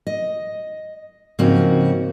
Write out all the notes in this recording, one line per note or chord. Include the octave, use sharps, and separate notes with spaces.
D#5
G#2 C#3 F3 A#3 C4 F#4